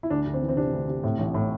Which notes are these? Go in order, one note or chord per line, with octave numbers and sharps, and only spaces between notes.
E4
D2 D4
D2
C4
E3
C4
C3 D4
D2
C3
A2
A1
A2